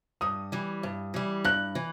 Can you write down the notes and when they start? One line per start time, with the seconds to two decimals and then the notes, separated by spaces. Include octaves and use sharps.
0.21 G2 D#6
0.52 E3 G3
0.83 G2
1.14 E3 G3
1.44 G2 F#6
1.75 E3